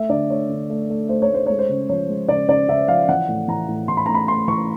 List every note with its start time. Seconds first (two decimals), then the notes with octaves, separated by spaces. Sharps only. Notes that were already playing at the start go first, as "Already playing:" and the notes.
Already playing: A3 E5
0.10 D3 D5
0.30 A3 C#5
0.49 D3
0.70 A3
0.90 A3
1.09 A3 C5
1.22 C#5
1.29 A3 C5
1.46 G#3 C#5
1.59 C5
1.69 C#3
1.89 F3 C#5
2.09 G#3
2.29 C#3 D5
2.49 C#3 D5
2.69 C#3 E5
2.88 F3 F5
3.08 E3 F#5
3.28 A2
3.48 E3 A#5
3.68 A2
3.88 E3 C6
3.97 B5
4.06 A2 A#5
4.15 B5
4.28 A3 C6
4.48 E3 C#6